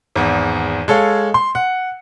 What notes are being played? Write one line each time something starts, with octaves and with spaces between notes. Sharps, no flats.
G#1 E2
G#3 A4 C#5 F5
C6
F#5